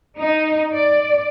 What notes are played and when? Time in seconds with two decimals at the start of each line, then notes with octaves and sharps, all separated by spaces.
0.15 D#4
0.74 D5